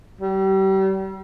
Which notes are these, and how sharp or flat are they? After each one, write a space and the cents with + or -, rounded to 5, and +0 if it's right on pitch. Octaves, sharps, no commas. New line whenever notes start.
G3 -35